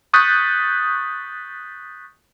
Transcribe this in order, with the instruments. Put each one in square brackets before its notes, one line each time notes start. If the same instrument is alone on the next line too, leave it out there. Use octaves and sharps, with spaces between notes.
[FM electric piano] C#6 D#6 F#6 G6 A6 B6